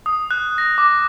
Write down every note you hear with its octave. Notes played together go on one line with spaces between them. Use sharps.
D#6
F#6
A#6
D6